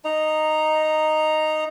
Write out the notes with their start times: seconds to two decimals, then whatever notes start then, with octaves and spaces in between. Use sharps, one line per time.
0.05 D#4 D#5 A#5